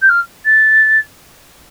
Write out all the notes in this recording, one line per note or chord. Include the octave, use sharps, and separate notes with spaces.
G6
F6
A6